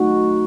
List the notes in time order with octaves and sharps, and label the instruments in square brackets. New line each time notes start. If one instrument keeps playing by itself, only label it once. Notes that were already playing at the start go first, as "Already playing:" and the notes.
Already playing: [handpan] A3 D#4 F#4